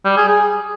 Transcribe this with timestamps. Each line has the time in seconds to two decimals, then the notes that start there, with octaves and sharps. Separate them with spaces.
0.05 G3
0.17 G#4
0.29 G#4